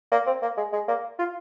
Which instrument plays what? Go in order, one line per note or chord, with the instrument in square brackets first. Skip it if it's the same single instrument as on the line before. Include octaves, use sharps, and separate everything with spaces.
[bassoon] A#3
C4
A#3
G#3
G#3
A#3
F4